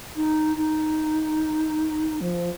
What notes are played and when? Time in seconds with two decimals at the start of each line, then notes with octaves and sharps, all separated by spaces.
0.16 D#4
0.57 D#4
2.21 F3